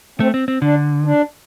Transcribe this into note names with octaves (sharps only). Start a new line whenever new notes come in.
A3 C4
C4
C4
D3 D4
D4